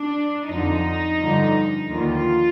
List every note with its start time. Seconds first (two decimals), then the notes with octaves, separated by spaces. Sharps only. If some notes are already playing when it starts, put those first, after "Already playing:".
Already playing: D4
0.48 F2 D3 F3 D#4
1.19 G2 D3 F3
1.91 D#2 D3 F3 F4